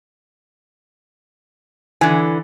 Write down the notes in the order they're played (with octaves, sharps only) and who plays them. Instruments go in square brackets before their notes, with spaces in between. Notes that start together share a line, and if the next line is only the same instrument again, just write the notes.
[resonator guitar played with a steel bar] D3 E3 [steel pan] G#5